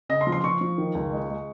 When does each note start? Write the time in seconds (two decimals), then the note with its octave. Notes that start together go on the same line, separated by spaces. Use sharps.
0.09 C#3 D#5
0.21 C6
0.27 F3
0.32 C6
0.44 F3 C#6
0.61 F3
0.78 D#3
0.95 C#2
1.12 G#3
1.29 G#3